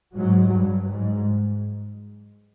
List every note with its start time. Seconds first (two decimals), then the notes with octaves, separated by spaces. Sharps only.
0.14 G#2 F#3
0.51 G2
0.88 G#2